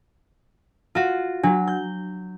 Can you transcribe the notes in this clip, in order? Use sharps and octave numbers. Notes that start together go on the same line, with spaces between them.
F4 F#4
F#3 D4 F#4
G6